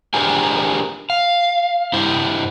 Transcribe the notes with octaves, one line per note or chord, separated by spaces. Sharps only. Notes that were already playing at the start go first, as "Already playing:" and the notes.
D4 G4 G#4 A#4 C5 G#5
F5
G2 E4 C5